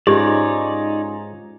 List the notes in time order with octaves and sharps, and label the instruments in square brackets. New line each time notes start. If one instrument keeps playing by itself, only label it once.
[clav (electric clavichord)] G#2 [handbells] C#4 F4 [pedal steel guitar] D#4 C#5 D5 [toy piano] G4